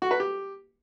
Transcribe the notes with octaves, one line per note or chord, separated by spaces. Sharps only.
F#4
B4
G4